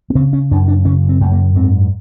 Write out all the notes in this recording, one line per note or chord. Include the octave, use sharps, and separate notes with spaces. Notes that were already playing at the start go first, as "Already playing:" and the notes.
B3
C#3 C4
C#4
F#2 D4
D4
C#3 C#4
C4
F#2 A3
A#3
G#2 C4